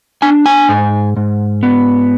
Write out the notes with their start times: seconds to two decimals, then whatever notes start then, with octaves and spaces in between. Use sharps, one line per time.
0.22 D4 G#5
0.46 G#5
0.69 G#2
1.17 G#2
1.63 B3